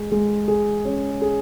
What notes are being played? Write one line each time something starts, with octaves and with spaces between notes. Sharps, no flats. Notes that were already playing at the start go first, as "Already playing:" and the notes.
Already playing: G#3 G#4
G#3
G#4
C#4
G#4